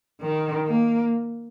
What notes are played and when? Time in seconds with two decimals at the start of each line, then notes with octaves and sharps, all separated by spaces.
0.21 D#3
0.67 A#3